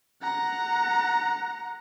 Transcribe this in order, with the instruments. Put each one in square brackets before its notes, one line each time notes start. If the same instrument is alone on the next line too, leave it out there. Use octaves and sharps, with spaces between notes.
[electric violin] F#5 A#5